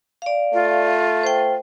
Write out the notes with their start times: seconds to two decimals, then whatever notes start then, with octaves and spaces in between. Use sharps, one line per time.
0.22 D5 F5
0.53 A3 F4
1.23 C5 G5